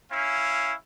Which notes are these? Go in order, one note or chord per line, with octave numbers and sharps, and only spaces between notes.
C#4 E4 F5